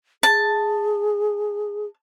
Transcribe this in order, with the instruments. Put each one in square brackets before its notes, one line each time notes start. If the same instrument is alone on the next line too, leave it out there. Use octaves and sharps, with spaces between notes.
[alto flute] G#4 [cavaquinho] A5